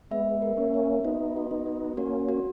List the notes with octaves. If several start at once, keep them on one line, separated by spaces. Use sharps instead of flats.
G#3 B3 E5
A#4
A#3 C#4
E5
B3 D#4 F#4
F#4
B3 D#4
F#4
A#3 C#4 F#4
F#4